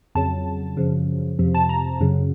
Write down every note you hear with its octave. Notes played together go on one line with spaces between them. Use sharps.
F2 C#3 F#3 A5
F#2 C#3 F3
F2 C3 F3
A5
A#5
F#2 C#3 F#3